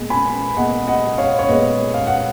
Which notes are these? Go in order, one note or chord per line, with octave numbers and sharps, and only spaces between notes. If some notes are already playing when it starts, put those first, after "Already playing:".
Already playing: A#2 G#3 B3
G#5 B5
A#2 G#3 B3 D#5 F#5
D#5 F#5
C#5 F5
C#5
A#2 G#3 B3 B4 D#5
F5
F#5